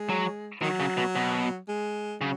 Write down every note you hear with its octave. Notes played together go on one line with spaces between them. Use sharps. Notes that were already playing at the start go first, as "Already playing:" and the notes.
Already playing: G#3
F#3
D#3 F#3
C#3
B2
B2
G#3
C#3 F#3